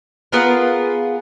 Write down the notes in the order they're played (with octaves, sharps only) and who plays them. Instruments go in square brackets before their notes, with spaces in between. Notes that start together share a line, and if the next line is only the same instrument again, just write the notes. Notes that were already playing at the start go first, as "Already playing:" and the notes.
[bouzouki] B3 F4 G#4 A#4